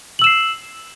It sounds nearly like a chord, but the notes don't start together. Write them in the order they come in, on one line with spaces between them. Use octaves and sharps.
F#7 E6 E7 C7